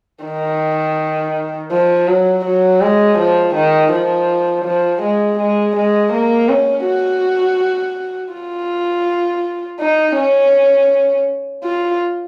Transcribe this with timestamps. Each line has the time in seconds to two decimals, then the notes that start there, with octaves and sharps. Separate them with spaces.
0.24 D#3
1.71 F3
2.07 F#3
2.45 F#3
2.81 G#3
3.19 F3
3.55 D#3
3.92 F3
4.65 F3
5.02 G#3
5.39 G#3
5.76 G#3
6.13 A#3
6.49 C#4
6.86 F#4
8.33 F4
9.79 D#4
10.16 C#4
11.64 F4